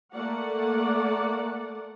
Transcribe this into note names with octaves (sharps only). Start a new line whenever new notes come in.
A3 A#3 D5 F#5